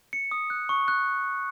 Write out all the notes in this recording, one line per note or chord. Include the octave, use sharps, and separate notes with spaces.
C#7
D#6
F#6
C#6
F#6